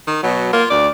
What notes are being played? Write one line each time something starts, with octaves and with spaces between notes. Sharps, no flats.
D#3
B2 F#3
A#3 F4
D2 D5